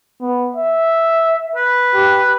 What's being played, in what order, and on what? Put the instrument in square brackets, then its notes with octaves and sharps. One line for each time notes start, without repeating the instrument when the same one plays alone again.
[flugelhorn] B3
E5
[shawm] B4
[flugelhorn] G4